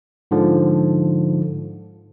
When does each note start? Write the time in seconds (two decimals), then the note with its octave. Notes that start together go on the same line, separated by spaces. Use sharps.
0.31 G#2 D3 F3